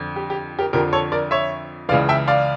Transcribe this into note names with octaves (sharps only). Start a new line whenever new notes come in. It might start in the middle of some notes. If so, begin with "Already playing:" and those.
Already playing: F2 D3 F3
G4
G4
G4 A#4
F2 D3 F3 G4 A#4
A4 C#5
A#4 D5
C#5 E5
C#2 C#3 E3 D5 F5
E5 G5
D5 F5